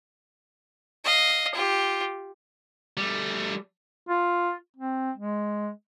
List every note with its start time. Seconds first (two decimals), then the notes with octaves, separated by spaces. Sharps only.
1.05 D#5 F5
1.55 F4 G4
2.97 G3 A3
4.09 F4
4.76 C4
5.17 G#3